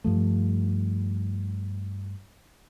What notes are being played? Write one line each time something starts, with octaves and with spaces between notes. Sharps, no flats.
G2 F3 A3